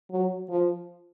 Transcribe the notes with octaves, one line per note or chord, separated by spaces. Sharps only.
F#3
F3